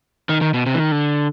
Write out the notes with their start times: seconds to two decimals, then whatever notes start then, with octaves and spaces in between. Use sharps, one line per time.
0.29 D#3
0.41 D#3
0.54 B2
0.66 C3
0.74 E3
0.79 D#3
0.92 D3